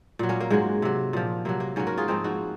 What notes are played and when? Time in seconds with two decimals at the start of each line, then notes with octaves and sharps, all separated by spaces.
0.19 A#2 F#3
0.29 A#3 C#4
0.41 A#3
0.50 G#2 F#3 G#3
0.82 C3 F#3
1.13 A#2 F3
1.45 C3 F#3 A#3
1.60 A#3
1.76 G#2 F#3 A#3 C#4
1.87 F#4 A#4
1.98 F4 G#4
2.08 G#2 F3 C4 D#4
2.24 D#4 F#4